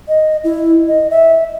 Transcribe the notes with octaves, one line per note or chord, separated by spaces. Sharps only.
D#5
E4
D#5
E5